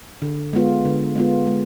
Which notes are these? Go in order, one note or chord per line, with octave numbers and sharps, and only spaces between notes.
D3
G#3 B3 F4
D3
G#3 B3 F4
G#3